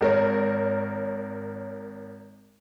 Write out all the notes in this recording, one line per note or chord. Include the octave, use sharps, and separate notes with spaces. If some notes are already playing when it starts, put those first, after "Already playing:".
G#1 A#4 C#5